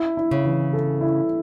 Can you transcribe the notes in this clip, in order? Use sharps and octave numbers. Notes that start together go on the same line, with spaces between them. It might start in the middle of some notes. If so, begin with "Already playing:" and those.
Already playing: E4
E4
C#3
E3
A4
E4